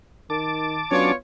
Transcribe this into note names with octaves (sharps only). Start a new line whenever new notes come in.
D#3 A5 D6
F#3 B3 C#4 D4 F4 C#5